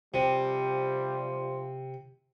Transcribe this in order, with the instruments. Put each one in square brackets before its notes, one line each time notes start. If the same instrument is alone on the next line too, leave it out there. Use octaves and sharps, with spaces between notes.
[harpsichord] C3 [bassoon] F3 [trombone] G3